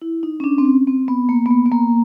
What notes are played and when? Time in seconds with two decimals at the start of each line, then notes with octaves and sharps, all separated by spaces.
0.02 E4
0.23 D#4
0.40 C#4
0.44 D4
0.58 C4
0.65 C#4
0.87 C4
1.08 B3
1.29 A#3
1.46 B3
1.50 A#3
1.66 B3
1.72 A#3